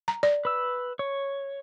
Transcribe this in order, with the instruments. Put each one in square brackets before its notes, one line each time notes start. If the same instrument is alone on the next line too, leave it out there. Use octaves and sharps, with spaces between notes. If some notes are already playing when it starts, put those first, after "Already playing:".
[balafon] A#5
D5
[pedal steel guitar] B4 E6
C#5